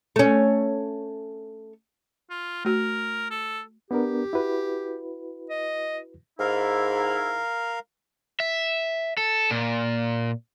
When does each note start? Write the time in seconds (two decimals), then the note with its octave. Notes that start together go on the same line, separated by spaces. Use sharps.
0.16 A3 C#4
2.30 F4
2.65 A3 F#4 A#4
3.30 A4
3.91 B3 D4 G4 A#4
4.33 E4 F#4 B4
5.50 D#5
6.40 G#2 E4 A#4 F5
8.40 E5
9.17 A4
9.51 A#2